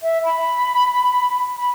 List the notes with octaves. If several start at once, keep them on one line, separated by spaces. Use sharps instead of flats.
E5
B5
B5